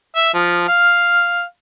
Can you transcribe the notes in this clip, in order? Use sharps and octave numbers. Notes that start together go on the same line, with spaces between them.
E5
F3
F5